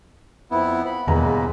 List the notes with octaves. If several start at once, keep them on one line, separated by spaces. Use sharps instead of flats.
F2 B3 E4
B5
E1 E2 G3 G#3 A#3 B4 A#5